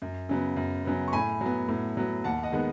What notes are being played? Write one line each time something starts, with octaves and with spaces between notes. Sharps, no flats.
F#2
C#3 F#3 B3
F#2
C#3 F#3 B3
C#6
A2 G#5 B5
F#3 B3
A2
F#3 B3
D#2 F#5 A5
D#5 F#5
D#3 G#3 B3